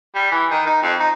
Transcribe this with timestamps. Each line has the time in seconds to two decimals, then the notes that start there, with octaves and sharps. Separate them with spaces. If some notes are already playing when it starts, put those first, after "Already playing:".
0.15 G3
0.31 E3
0.51 D#3
0.66 D#4
0.83 F2
1.00 D#4